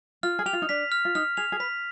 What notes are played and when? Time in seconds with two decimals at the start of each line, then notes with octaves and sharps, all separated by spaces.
0.23 F4 F6
0.39 G#4
0.46 G4 F7
0.53 F4
0.62 D#4
0.69 D4 B6
0.92 F6
1.05 F4
1.15 D#4 F6
1.37 G#4 F7
1.52 G#4
1.60 B4 B6